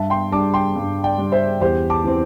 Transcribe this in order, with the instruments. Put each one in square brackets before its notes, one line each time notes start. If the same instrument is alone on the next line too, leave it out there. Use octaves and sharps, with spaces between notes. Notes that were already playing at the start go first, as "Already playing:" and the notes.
Already playing: [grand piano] G2 E5 A5
G5 C6
G3 D4 A5 D6
G5 C6
G2
D5 G5
G3 D4
C5 E5
E2 G4 C5
A5 D6
E3 C4